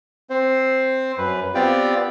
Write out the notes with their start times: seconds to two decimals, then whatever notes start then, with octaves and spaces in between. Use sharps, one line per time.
0.30 C4 C5
1.18 F#2 B4
1.55 B3 C4 F4 G4 D5 G5